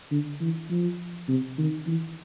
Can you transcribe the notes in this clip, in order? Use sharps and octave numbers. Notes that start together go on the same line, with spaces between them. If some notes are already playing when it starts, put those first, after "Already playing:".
D3
E3
F3
C3
D#3
E3